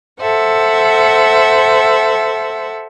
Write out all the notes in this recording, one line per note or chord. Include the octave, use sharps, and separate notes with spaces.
A4 C5 E5 F#5